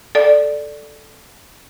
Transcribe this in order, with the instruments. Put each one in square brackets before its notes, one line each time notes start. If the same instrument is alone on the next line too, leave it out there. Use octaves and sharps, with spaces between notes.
[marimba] A4 D5